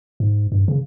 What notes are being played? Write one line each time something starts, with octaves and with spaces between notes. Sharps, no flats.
G#2
G2
C#3